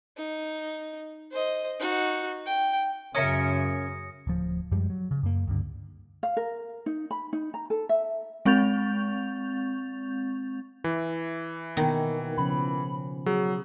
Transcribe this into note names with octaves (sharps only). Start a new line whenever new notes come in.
D#4
C5 D#5
D#4 F#4
G5
F#2 C#3 C#4 A#4 E5 D#6 A#6 C#7
D1 F3
F#2 F3 G3 G#3
F#3
C#3
F#2 A#3
C#2 G2 D3
F5
A#4
D#4
B5
D#4
A#5
A4
E5
G#3 C4 C#6 G6 A6 F7
E3 E4
B2 D#3 A#3 B3
C#3 F3 C#4 B5
F#3 G#4